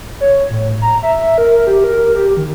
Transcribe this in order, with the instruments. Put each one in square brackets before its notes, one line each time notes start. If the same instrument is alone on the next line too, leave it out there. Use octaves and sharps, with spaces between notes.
[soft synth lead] C#5
A2
A#5
E5
A#4
G4
A#4
G4
D#3